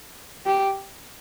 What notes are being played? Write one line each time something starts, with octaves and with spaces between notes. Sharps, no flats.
G4